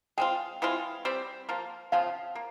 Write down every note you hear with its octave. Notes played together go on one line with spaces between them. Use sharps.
G#3 C4 F4 G5
E3 G#3 C4 F4
G3 C4 G4
F3 A#3 F4
C#3 F3 C4 F4 F5
A#3